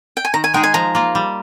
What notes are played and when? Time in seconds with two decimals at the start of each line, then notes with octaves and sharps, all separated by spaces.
0.17 G5
0.25 G#5
0.34 D#3 A#5
0.44 G#5
0.54 G#3 D#4 G#4 G5
0.63 G#5
0.74 F3 A#5
0.95 A#3 F4
1.15 G3